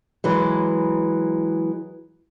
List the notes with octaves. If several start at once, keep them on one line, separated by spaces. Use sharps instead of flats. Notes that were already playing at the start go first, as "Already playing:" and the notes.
E3 F#3 G#3